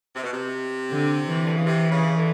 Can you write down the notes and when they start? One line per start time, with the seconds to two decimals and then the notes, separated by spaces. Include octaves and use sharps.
0.16 C3
0.24 B2
0.32 C3
0.90 D3
1.28 E3
1.44 D3
1.55 C#3
1.66 C3
1.91 C#3
2.17 D3